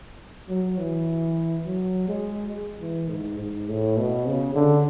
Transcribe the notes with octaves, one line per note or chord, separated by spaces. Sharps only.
F#3
E3
F#3
G#3
E3
G#2
G#2
A2
B2
C#3
D3